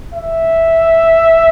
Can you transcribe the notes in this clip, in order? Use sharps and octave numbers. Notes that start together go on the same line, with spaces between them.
E5